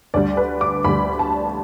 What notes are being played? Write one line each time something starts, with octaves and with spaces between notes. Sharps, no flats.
D2 D3 G3 D5
B4
D6
D2 D3 G3 B5
A5